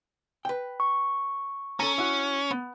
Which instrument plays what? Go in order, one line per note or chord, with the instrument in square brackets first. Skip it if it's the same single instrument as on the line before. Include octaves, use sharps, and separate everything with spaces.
[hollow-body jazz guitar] B4 G5
[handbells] C#6
[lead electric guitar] C#4 [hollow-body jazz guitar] A4 A#5
[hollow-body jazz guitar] E4 F#4
B3